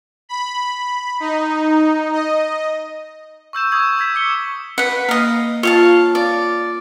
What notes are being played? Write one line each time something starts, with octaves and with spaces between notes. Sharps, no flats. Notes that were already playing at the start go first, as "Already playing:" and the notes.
B5
D#4
D#5
C#6 E6 G6 E7
C#6 D#6 E6 G6 G#6
G6 G#6 B6 E7
D6 C#7 G7
B4 F#5
A#3 D#5 F5
F4 C#5 F5 A5
D5